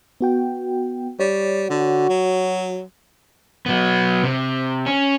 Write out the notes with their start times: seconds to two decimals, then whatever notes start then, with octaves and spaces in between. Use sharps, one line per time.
0.21 B3 F#4 G5
1.20 G3 C#5
1.70 D3 F#4
2.09 F#3
3.66 F#3 B3
4.23 C3
4.86 C#4